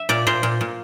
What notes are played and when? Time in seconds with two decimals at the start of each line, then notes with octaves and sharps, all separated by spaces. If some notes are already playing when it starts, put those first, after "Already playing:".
Already playing: E5
0.09 A#2 D5
0.27 A#2 C5
0.43 A#2
0.61 A#2